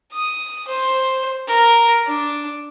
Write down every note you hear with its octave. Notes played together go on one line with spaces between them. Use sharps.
D#6
C5
A#4
D4